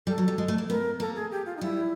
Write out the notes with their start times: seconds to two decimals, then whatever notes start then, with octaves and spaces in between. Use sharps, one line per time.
0.07 G3 A4
0.18 F#3
0.28 G3
0.38 G#3
0.48 A3
0.58 A#3
0.69 B3 A#4
1.00 A#3 A4
1.16 G#4
1.31 G4
1.46 F4
1.57 D#4
1.61 G3 E4